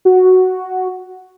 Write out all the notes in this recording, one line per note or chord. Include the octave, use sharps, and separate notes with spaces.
F#4